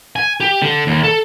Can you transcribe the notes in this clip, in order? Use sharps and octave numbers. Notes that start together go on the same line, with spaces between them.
G#5
G4
D3
D#2
A4